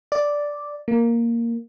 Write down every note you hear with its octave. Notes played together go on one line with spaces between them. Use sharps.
D5
A#3